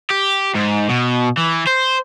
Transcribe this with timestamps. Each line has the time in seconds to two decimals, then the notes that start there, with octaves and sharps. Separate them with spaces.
0.10 G4
0.55 G#2
0.89 B2
1.37 E3
1.67 C5